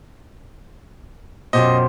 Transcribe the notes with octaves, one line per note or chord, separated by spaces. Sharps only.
F#2 B2 F4 G4 C5 D#5